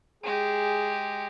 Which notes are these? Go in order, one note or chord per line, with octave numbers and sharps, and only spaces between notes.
G#3 G4 G#4